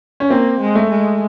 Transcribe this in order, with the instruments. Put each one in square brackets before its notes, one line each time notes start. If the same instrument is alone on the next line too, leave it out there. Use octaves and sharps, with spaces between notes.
[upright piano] C#4
[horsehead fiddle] A#3 [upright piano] C4
[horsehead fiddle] G#3
[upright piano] A3
[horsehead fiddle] G#3